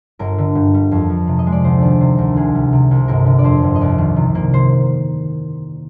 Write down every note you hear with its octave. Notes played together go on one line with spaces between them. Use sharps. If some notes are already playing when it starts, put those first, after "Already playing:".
G1 A#4
D3
G2
G3
F2
F3
C3
D#5
G#3
D5
D2 C5
D#3 D5
C3 C5
D2 A#4
C2 G#4
G3
C3
C2
G1 A#4
D3
D5
F2 C5
G1
D#5
C2 D5
D#3
C3
A#3
C5